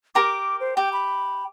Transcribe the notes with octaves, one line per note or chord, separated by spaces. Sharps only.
G4 A#4 D6
C5
G4 G5
B5